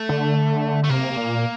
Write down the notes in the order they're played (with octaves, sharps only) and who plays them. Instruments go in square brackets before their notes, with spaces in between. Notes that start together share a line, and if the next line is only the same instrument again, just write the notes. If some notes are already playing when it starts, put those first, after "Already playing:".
Already playing: [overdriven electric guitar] A3
[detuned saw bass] D3
[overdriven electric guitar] A3
[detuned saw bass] C3 [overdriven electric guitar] A#3
[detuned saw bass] A#2